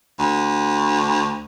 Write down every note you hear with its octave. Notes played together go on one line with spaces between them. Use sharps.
D2